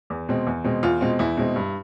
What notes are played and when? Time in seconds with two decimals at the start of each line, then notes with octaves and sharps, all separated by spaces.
0.10 E2
0.29 B2 G#3 C4
0.47 E2
0.64 B2 G#3 C4
0.83 E2 F4
1.01 B2 G#3 C4
1.19 E2 E4
1.37 B2 G#3 C4
1.56 G2